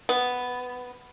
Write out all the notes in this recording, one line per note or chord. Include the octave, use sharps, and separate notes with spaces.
B3